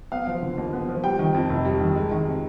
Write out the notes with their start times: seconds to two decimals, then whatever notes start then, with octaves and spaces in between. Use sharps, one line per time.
0.12 B3 F5
0.27 F3
0.43 D3
0.58 D#2
0.73 B3
0.89 F3
1.04 G3 G5
1.19 D#3
1.34 F2
1.50 F1
1.65 G3
1.80 D#3
1.96 G#3
2.11 D#3
2.26 C3